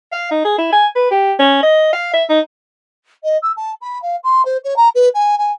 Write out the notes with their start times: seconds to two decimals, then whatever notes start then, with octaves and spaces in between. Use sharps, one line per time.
0.12 F5
0.31 D#4
0.45 G#4
0.58 E4
0.72 G#5
0.96 B4
1.11 G4
1.39 C#4
1.63 D#5
1.93 F5
2.13 E5
2.29 D#4
3.23 D#5
3.42 E6
3.56 A5
3.81 B5
4.02 F5
4.23 C6
4.45 C5
4.64 C#5
4.76 A#5
4.95 B4
5.14 G#5
5.38 G#5